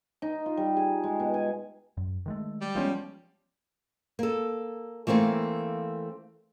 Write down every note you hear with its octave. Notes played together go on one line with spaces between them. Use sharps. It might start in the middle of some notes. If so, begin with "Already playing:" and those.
D#4
F4
G3
G#4
G#3
B2
G#5
F#2
D#3 G#3 A3
G3
F3 G#3 B3 C#4
A#3 A4
E3 A3 A#3 C4 F5